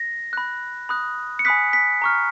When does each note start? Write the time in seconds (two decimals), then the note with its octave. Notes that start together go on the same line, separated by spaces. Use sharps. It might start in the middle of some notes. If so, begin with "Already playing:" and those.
Already playing: A#6
0.33 B5 F#6
0.89 B5 D#6 F#6
1.39 C#7
1.45 G#5 B5 D#6 F#6 B6
1.73 B6
2.02 A#5 C#6 F6